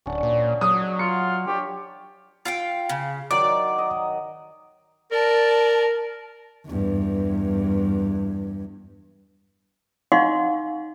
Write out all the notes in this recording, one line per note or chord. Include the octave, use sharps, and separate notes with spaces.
D1 C#4 D4 F#5
A#2
F#3 D#6
D#5
F4 C#7
D4 G4 C#5 D5
F4 F5 G5
C#3
D#3 F#3 F#4 D5 D6
D#5
A#4 D5 A5
E2 G2
D#4 D#5 F5 F#5 C6 C#6